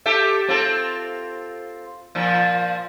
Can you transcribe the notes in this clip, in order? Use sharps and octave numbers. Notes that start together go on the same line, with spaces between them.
G4 A4 E5
C4 F4 A4
A#2 F3